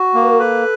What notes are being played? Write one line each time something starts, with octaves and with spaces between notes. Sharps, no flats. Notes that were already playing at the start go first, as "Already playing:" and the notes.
Already playing: F#4
A#3
B4
A#4
A4 B4